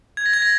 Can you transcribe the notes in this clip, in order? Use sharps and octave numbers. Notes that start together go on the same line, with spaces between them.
G#6
A#6
G#6
A#6